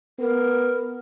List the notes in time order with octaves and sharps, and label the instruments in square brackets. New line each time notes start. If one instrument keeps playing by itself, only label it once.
[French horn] B3 [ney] A#4